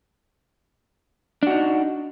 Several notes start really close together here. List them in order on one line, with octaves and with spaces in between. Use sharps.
D4 F#4 D#4